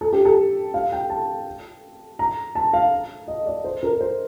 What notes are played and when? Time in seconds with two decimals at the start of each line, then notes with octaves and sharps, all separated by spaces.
0.01 A4
0.13 G4
0.25 A4
0.74 F5
0.92 G5
1.10 A5
2.19 A#5
2.55 A5
2.73 F5
3.28 D#5
3.46 D5
3.65 C5
3.83 A#4
4.01 C5